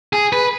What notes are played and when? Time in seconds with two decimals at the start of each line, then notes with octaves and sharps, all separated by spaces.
0.13 G#4
0.32 B4